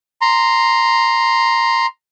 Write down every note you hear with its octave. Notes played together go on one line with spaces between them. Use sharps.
A#5 C6